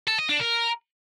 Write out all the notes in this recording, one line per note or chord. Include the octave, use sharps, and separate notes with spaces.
A4
D#5
D4
A#4